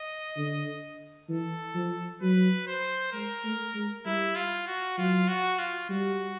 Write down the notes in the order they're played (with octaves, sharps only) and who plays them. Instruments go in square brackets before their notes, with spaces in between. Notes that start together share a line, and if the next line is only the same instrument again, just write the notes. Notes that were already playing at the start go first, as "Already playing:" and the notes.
Already playing: [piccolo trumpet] D#5
[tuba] D3
[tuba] E3 [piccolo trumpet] A4
[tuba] F3
[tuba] F#3 [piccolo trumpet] B4
[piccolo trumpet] C5
[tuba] G#3 [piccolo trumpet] A#4
[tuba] A3
G#3
[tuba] G3 [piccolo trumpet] E4
[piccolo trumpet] F4
F#4
[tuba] F#3 [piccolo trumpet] F4
[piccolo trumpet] F#4
F4
[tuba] G3 [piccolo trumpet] F#4